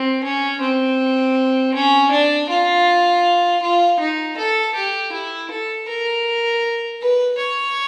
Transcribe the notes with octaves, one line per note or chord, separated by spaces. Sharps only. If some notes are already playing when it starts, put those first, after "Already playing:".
Already playing: C4
C#4
C4
C#4
D4
F4
F4
D#4
A4
G4
E4
A4
A#4
B4
C#5